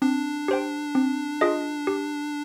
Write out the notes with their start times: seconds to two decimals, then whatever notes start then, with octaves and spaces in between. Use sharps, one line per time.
0.02 C4 D4
0.48 G4 C5 G5
0.95 C4
1.41 F4 G#4 D#5
1.87 G4